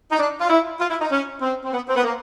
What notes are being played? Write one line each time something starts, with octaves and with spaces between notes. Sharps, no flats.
D#4
D4
F4
E4
F4
E4
D#4
C#4
C4
C4
B3
C4
B3
A#3